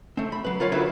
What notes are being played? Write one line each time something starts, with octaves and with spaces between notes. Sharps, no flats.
A3 C4
B5
F#3 B4
F4 A#4 C#5 F5 B5
D3 D#3 F#3 D#4 E4 B4